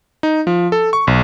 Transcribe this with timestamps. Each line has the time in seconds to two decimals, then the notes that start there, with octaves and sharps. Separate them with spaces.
0.23 D#4
0.47 F3
0.72 A4
0.93 C#6
1.07 B1